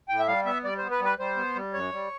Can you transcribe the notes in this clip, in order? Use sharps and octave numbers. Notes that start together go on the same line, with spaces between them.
A2 G5
E5
G3 F5
B3 E5
G3 D5
B3 C5
B4
G3
B4
G3 C5
B3
G3
F#2 C#5
G3